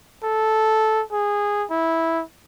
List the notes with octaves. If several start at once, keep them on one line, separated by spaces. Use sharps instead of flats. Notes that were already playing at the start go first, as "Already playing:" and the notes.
A4
G#4
E4